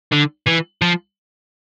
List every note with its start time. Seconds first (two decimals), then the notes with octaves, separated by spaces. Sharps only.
0.12 D3
0.47 E3
0.82 F3